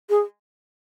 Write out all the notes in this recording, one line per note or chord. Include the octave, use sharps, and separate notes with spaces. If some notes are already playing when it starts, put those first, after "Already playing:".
G#4